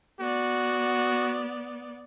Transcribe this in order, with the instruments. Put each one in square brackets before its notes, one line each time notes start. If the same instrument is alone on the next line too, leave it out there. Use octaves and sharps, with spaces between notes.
[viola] B3 D5 [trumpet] F#4